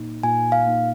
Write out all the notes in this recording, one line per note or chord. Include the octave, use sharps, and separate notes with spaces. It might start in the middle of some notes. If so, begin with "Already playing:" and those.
Already playing: A#2 A#3 D#4
A#2 G#5
F5
A#3 D#4